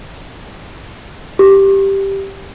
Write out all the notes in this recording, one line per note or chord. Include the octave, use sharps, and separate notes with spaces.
G4